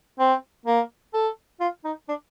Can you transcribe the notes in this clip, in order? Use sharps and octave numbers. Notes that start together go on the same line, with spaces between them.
C4
A#3
A4
F4
D#4
D4